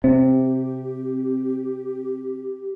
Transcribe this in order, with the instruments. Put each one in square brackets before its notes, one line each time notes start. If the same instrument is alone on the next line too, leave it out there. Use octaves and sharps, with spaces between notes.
[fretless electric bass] C3 [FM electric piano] C4 [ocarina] G4